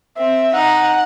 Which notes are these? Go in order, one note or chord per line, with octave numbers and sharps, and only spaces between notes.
C4 E5
D#4 F#5